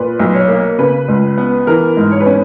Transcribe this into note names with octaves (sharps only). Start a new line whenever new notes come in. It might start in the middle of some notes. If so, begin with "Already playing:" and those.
Already playing: A#2 B4
B1
C#5
A#3
C#3 B4
C#2
B3
E3 A#4
G#2
C#5
B4
C#4